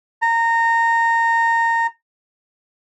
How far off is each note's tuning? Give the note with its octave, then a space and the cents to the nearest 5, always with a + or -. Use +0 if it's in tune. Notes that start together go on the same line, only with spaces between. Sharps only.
A#5 -20